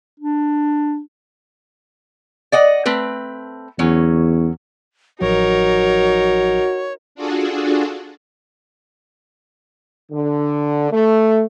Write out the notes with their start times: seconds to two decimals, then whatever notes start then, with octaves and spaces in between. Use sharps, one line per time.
0.19 D4
2.52 D5 D#5 F#5
2.86 A3 C4 B4
3.79 E2 F#3 C#4
5.21 A1 F3 F#3 D#4 F#4 A#4 C#5
7.15 D4 F4 F#4 G#4 A4
10.12 D3
10.91 A3